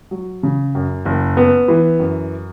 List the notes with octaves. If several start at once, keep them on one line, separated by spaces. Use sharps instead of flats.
F#3
C#3
F#2
F#1
B3
E3
F#2